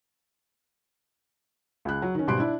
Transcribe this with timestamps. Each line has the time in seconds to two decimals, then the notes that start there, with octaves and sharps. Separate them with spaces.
1.85 C#2 F#6
2.02 F#3
2.15 D#3 C#4
2.27 G#1 B2 G3 C6 F#6 D7
2.39 D4 E4